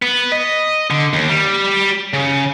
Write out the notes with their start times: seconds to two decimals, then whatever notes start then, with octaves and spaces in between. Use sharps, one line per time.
0.02 B3
0.32 D#5
0.91 D3
1.13 D#2
1.28 G3
2.13 C#3